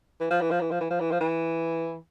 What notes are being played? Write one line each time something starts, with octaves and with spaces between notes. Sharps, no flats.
E3
F3
E3
F3
E3
F3
E3
F3
E3
F3
E3